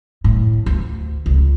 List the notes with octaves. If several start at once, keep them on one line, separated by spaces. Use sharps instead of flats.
A2
D2
C#2